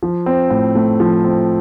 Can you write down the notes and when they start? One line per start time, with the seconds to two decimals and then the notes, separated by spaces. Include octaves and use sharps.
0.03 F3
0.26 C4
0.50 A2
0.76 A3
1.00 F3
1.25 C4